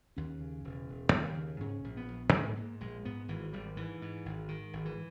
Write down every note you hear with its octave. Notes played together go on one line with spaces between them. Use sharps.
D#2 C#4
C#3
E1
E1
D#2
C#3
G#2 C#4
A#1
B3
A#1
G#2 B3
G#2 A#3
A#1 G#3
G#2 B3
G#1 E3
G#1 G3
G#2 E3
G#2
G#1
G#2 D#3
G#1
E3